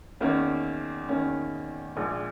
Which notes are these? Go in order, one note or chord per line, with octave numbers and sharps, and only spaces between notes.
E2 D#3 A#3 C#4
E2 D#3 A#3 C#4
A#1 A#2 G#3